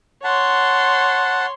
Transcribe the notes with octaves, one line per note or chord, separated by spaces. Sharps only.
C#5 F#5 A5 C6